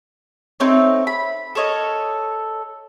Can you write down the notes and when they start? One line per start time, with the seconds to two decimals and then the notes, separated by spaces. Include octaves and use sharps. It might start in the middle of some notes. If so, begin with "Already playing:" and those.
0.60 A3 C4 D#4 C#5
1.07 B5
1.55 A4 A#4 C#5 D#5